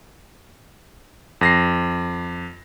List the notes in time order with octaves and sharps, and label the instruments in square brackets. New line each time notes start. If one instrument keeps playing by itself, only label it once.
[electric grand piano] F2 A#6 C7